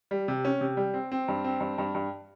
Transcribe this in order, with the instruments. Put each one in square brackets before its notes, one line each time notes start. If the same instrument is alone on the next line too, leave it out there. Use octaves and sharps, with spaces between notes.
[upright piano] G3
C3
C#4
C3
G3
C4
C4
G2
C4
G2
G2
G2